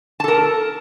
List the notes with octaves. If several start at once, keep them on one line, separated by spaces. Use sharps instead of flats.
A4 A#4 A5